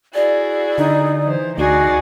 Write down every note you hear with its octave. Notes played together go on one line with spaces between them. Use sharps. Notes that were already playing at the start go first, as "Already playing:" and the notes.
E4 F#4 G#4 D5
D3 D#4
E3 C5
D2 D#4 F#4 G#4 D5